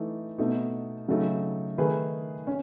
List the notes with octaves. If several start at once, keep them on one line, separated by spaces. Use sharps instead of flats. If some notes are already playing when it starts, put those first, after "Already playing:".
Already playing: E3 A3 D#4
B2 A3 D#4
C#3 F#3 A3 D#4
D#3 A3 D#4 G#4 B4
C#4